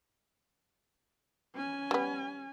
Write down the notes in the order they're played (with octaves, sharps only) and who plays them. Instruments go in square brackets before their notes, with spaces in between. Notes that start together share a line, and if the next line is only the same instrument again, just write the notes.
[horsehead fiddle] C#4 G#5
[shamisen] G3 B3